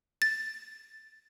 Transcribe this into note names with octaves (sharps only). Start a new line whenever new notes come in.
A6